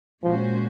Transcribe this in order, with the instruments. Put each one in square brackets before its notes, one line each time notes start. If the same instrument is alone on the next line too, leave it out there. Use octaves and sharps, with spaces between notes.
[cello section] A#2 G#3 C#4 F#4 C5 [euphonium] F3